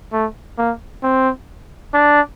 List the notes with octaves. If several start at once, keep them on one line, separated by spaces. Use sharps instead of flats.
A3
A#3
C4
D4